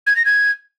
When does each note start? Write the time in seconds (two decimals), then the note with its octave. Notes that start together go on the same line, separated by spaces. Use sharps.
0.07 G#6
0.16 A#6
0.25 G#6